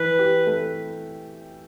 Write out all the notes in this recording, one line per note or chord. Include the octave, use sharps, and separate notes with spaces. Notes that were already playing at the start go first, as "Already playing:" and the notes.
Already playing: E3 B4
G4
A3